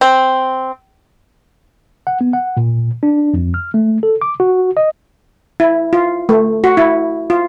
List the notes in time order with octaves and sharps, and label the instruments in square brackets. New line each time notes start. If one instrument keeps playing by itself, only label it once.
[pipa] C4
[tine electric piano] F#5
B3
F#5
A#2
D4
F2
F6
A3
A4
D6
F#4
D#5
[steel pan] E4
F4
A3
F#4
E4
F4